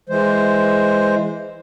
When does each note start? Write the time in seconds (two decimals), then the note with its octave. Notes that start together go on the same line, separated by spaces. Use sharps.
0.09 E3 G#3 C5